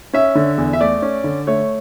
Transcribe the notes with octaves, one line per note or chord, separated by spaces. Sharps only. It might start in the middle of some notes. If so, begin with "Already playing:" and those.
C#4 E5
D3
E2
E5
A3 D5
C#4
D3
A3 C#5